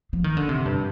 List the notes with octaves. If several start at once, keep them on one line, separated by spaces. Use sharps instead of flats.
F3
D#3
D3
C3
G2